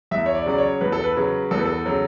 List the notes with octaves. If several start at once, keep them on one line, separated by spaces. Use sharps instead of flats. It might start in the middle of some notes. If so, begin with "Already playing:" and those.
E2 E5
C#5
D5
C#3 F#3 D5
C#5
E2 B4
A4
B4
C#3 F#3
E2 A4
B4
A4
C#3 F#3